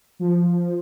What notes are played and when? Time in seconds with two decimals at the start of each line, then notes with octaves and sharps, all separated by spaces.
0.19 F3